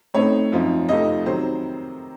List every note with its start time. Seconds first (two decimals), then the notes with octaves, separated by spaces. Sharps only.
0.14 A2 A3 C4 D#4 C#5
0.52 F#2 F3 C4 D#4
0.89 F2 C3 F3 A3 D#4 D#5
1.26 C3 D#3 F#3 C5